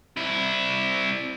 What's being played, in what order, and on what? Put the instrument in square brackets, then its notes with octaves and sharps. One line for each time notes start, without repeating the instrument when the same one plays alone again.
[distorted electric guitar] C2 E4